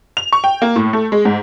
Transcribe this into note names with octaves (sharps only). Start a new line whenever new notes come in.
F7
C#6
G5
A#3
A2
A3
G#3
G#2